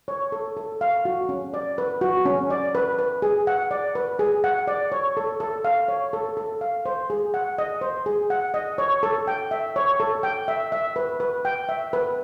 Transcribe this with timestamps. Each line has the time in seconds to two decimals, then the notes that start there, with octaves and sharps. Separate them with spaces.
0.08 C#5
0.32 A4
0.57 A4
0.81 F5
1.05 F#4
1.29 C#4
1.54 D5
1.78 B4
2.01 F#4
2.26 C#4
2.50 D5
2.75 B4
2.99 B4
3.22 G#4
3.47 F#5
3.71 D5
3.95 B4
4.19 G#4
4.44 F#5
4.67 D5
4.92 C#5
5.17 A4
5.40 A4
5.65 F5
5.88 C#5
6.13 A4
6.37 A4
6.61 F5
6.86 C5
7.10 G#4
7.34 F#5
7.58 D#5
7.81 C5
8.06 G#4
8.30 F#5
8.54 D#5
8.78 C#5
9.03 A4
9.27 G5
9.51 E5
9.76 C#5
10.00 A4
10.23 G5
10.48 E5
10.72 E5
10.96 B4
11.20 B4
11.45 G5
11.69 E5
11.93 B4